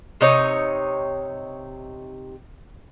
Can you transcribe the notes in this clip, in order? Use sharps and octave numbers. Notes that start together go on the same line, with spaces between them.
C3 D#4 C#5